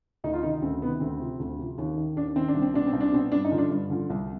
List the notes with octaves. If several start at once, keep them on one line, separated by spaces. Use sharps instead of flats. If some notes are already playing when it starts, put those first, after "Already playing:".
D2 D#4
F4
C3 D#3 D#4
D2 C4
C3 D#3 B3
D2 C4
C3 F3
D2
C3 F3
D#2
D#3
D#2 D4
D#3 C4
D4
C2
C4
B2 D4
C4
C2
D4
B2 C4
G2 D4
D#4
D3 F3
D4
G2
D3 F3
C2